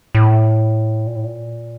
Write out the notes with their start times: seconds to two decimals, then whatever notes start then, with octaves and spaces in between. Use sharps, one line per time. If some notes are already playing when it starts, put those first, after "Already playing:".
0.15 A2
1.07 A#2
1.16 A2
1.25 A#2